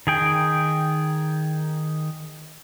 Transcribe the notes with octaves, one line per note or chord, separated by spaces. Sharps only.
D#3 G#4 G5